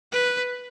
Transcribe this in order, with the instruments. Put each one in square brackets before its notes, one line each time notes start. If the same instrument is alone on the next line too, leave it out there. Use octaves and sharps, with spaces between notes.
[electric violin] B4